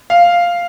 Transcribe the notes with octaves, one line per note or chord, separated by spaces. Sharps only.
F5